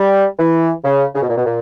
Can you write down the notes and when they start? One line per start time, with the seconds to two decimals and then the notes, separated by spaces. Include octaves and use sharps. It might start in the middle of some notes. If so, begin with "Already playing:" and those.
Already playing: G3
0.39 E3
0.84 C#3
1.15 C#3
1.22 B2
1.29 A#2
1.37 B2
1.45 A#2